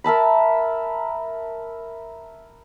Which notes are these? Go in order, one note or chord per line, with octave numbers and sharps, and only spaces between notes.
A#4 E5 A5 B5